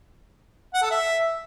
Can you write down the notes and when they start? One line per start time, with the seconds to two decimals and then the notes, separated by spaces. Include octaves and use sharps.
0.74 F#5
0.82 A4
0.91 E5